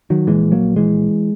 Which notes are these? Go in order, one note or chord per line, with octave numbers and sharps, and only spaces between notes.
D#3 F#3
A#1 A#2 E3 G#3
F#3 A#3
E3 G#3